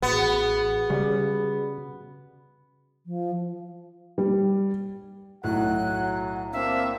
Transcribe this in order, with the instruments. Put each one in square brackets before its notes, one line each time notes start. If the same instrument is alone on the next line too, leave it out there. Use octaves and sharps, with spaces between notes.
[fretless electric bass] A1 [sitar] B3 [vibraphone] F#4 G#4
[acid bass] C#3 [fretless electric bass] G3
[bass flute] F3
[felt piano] G3
[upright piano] B1 A2 [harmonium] F#3 [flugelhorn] F#5 [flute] F#6
[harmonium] A#3 D4 F5 [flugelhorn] C4 [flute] E5